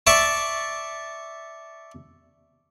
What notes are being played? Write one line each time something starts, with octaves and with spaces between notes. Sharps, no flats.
D5 E5 A5 C#6